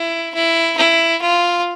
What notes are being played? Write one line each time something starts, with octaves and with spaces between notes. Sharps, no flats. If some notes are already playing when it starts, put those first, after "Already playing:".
Already playing: E4
E4
E4
F4